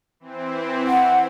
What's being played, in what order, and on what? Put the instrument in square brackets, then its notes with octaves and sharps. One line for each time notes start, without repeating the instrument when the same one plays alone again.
[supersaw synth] E3 C4
[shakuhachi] F#5